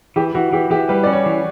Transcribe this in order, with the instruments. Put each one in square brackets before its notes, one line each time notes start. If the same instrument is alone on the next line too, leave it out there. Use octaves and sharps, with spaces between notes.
[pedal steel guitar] E3 [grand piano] G4
[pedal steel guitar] E3 [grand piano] F#4
[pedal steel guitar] E3 [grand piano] G4
[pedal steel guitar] E3 [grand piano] G4
[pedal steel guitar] G3 [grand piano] B4
[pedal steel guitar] C#4 [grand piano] D5
[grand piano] C#5
[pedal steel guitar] E3